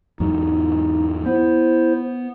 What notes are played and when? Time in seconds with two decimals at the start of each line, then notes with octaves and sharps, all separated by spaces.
0.20 E2 G#2 F#3 D#4
1.26 B3 E4 C5